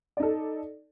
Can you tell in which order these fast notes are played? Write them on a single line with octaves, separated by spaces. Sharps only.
D5 D#4 A4